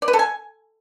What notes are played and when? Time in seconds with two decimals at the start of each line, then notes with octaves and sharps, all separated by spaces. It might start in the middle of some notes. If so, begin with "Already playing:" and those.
0.02 D5
0.08 B4
0.13 A4
0.19 G#5